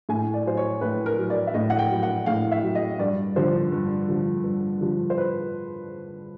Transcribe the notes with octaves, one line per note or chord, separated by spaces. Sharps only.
A2 G#5
D5
F#3 C5
C#5
A2 B4
A#4
F#3
D5
E5
A2 D#5
F#5
G5
F#3
F#5
A2 F5
E5
F#3
D#5
G2 D5
D3 F3 C5
G2
D3 F3
G2
D3 F3
C5
B4